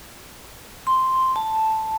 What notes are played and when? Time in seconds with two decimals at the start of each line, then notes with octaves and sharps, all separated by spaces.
0.87 C6
1.36 A5